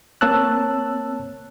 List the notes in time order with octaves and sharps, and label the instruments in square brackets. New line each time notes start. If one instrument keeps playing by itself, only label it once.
[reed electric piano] A#3 C4 C#5 A5 E6 F#6